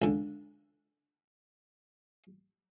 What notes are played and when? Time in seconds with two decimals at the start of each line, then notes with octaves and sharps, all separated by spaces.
0.02 C#2 D3